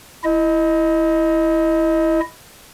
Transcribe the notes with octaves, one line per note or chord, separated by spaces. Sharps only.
E4 D#5